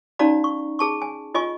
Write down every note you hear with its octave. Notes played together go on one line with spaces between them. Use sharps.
C#4 D#4 F#4 D5 F5 A#5
C#6
G#4 A5 C#6
G#5
F4 D#5 G#5 C#6